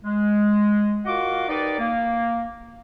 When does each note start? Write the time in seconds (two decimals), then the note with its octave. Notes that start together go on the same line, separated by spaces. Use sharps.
0.04 G#3
1.05 F4 F#4 A#4 D#5 F#5 D6
1.49 D#4 G4 A#4 B4 D5
1.79 A#3